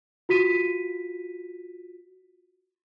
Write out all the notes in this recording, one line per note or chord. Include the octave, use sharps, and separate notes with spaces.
F4 F#4 B6 D#7